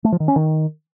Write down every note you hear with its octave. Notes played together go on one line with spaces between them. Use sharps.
A3
F3
D#3
C#4
D#3